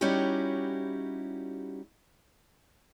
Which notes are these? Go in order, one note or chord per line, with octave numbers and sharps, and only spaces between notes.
G3 C#4 D#4 E4 F#4 G4